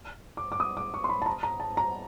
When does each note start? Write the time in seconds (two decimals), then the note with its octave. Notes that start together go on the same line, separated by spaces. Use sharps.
0.37 D6
0.52 D6
0.60 D#6
0.77 D6
0.94 C#6
1.04 C6
1.09 B5
1.22 A5
1.26 A#5
1.43 A#5
1.60 A5
1.77 A#5